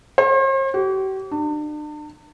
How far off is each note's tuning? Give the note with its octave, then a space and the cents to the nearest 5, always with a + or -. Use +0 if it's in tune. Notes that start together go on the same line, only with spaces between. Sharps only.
C5 +45
G4 -45
D4 +40